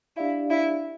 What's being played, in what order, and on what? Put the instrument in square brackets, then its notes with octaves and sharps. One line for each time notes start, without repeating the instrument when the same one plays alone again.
[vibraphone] D4 G4 D5 F5 [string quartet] E4
[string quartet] E4